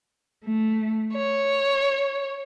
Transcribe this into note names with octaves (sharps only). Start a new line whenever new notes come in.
A3
C#5